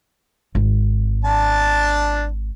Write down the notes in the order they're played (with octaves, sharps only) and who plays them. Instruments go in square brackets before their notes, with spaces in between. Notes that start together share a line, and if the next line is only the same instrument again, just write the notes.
[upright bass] G#1
[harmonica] D4 A5